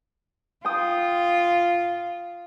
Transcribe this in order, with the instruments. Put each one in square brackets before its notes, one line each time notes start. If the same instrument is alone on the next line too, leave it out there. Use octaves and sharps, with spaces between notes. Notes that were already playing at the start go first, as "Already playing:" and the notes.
[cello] F4 [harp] G5 D#6